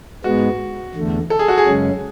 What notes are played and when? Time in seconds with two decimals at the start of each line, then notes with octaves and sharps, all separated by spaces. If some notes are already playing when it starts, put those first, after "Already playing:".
0.24 G#2 G#3 B3 F#4
0.95 E2 D3 A3
1.30 A4
1.39 G#4
1.48 F#4
1.58 G#4
1.66 F#2 C#3 G#3 C#4